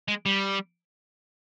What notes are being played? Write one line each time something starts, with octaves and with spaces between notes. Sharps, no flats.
G#3
G3